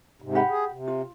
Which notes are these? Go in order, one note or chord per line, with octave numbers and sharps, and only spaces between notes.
G#2 C3
G4 F#5 B5
G#4
C3
F4